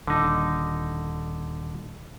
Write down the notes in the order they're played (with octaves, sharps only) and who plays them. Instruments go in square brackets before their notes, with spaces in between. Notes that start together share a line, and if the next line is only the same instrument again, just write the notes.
[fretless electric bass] D#1 [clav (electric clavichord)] D3 D#4